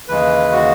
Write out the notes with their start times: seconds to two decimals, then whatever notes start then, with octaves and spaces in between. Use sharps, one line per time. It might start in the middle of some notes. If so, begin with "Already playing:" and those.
0.08 D#2 C#3 E3 G#3 B4
0.52 F#4